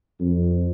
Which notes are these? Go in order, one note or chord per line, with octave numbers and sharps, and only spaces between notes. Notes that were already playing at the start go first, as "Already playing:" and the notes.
F2